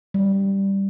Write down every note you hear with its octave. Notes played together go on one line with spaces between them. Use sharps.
G3